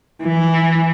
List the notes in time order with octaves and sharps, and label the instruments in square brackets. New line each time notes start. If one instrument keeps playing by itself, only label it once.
[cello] E3